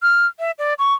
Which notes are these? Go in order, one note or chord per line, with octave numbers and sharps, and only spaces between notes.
F6
E5
D5
C#6